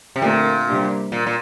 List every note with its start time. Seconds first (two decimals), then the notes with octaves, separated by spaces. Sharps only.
0.16 C3
0.22 A#2 D3 A3 C4 G4 A#4
0.67 C3 G3 A#3 D4 G4
1.12 A#2
1.27 A#2